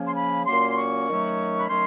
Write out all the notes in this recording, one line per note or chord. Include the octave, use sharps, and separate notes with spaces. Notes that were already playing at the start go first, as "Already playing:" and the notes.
Already playing: C#3 F3 A#3 C#4
C6
B5
A#2 F#3 A#3 C#4 C6
C#6
D#3 F#3 A3 C#4
B5
D#3 F#3 A3 C#4 C6